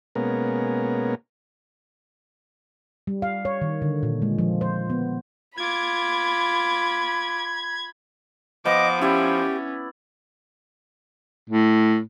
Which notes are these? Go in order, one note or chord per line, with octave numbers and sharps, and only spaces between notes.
B2 G#3 A#3 B3 C#4 A#4
G3
F5
C#5
D#3
D3
A#2
G#3
F3
C5
B3
F4 B5 D6 G#6
F3 B3 D#5 D6
C#4 E4 G4 D5
A2